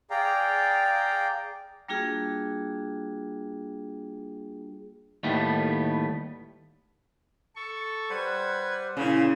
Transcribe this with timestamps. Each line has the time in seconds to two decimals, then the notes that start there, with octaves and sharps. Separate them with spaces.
0.11 G#4 D5 F5 G5 A#5
1.88 G3 A#3 D4 F4 F#4 G#4
5.23 D#2 A2 D#3 G3 A3 B3
7.56 A4 C#6
8.10 G3 B4 C5 F#5 G#6
8.97 A#2 C#3 C#4 E4